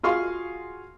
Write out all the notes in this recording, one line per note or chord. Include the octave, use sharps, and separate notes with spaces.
F4 F#4 G#4 F5 C6 C#6